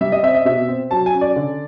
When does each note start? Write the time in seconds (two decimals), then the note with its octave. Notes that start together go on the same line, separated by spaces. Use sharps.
0.01 G3 E5
0.12 D#5
0.23 C4 E5
0.35 D#5
0.45 B2 E5
0.68 C4
0.91 F#3 A5
1.06 G#5
1.13 C#4
1.21 D5
1.36 D3